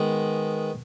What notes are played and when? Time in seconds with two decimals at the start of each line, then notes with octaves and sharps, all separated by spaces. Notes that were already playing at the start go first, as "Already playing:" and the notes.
Already playing: D#3 G#3 B3